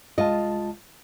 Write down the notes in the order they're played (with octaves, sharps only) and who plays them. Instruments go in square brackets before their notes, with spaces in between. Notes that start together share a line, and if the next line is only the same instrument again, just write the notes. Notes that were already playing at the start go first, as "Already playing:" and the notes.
[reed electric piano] C2 G#3 A5 [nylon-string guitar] F4 D#5